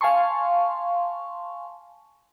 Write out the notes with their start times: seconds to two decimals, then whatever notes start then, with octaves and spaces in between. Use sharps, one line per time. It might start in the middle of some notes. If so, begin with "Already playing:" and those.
0.01 F5 G#5 A5 C6 C#6